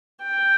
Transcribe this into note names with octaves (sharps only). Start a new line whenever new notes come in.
G5